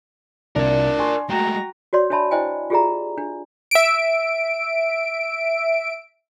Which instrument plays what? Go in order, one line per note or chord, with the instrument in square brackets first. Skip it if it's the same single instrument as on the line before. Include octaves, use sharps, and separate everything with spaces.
[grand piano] C2 [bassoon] D4 [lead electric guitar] A#4 D5
[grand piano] G#5 C6 C#6
[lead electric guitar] G#3 A3 [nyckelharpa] F#4 A#5 [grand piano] G5
[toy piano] F#4 C#5 D5 C6
D4 C#5 E5 A5 B5 C6
E4 C5 D5 D#5 G5 G#5
F4 G4 G#4 D5 E5 A#5
D4
[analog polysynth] E5 D7